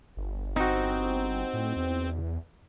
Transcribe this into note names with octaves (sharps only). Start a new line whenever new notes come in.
G1
C4 D#4 F#4
A2
E2